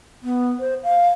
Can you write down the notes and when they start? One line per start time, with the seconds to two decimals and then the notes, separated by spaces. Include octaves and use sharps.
0.23 B3
0.60 C5
0.83 F5